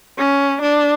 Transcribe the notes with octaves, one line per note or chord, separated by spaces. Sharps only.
C#4
D4